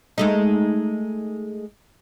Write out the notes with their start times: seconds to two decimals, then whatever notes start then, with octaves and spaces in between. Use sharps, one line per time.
0.18 G#3 A3 D#4